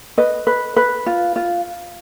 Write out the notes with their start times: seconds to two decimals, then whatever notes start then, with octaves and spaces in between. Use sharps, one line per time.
0.18 B4 D#5
0.47 B4
0.76 B4
1.06 F4
1.36 F4